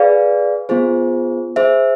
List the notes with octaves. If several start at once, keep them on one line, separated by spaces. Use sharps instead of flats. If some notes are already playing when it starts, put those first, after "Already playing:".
Already playing: G#4 B4 D5 F5
B3 F4 G#4 C5
G#4 C5 E5